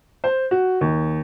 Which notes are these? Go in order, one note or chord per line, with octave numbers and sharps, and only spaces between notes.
C5
F#4
D#2